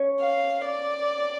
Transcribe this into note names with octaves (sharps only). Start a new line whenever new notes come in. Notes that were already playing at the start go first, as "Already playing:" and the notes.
Already playing: C#4 C#5
F5
D5